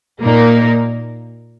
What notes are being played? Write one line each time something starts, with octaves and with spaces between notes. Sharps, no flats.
A#2 A#3 D#4 A#4